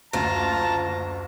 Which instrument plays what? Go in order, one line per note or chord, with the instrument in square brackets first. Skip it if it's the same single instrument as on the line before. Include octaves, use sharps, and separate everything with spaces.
[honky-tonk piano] F#1 D2 [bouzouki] F4 [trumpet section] A5 [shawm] A#5